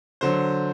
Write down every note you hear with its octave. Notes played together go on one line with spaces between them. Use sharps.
D3 F#3 C5